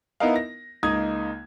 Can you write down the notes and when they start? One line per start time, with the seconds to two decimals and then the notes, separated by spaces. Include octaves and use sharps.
0.20 B3 D#4 E4 A#4 D#5 F5
0.36 A#6
0.83 C#2 A#3 D#4 D#6 G#6